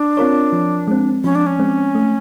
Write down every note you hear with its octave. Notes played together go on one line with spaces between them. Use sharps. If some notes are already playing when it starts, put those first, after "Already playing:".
Already playing: D4
C4 F4 A#4 C#5
F3
G#3 C4
F3 C#4
D4
C#4
G#3 C4
A3